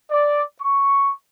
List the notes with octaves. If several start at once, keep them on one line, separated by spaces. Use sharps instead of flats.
D5
C#6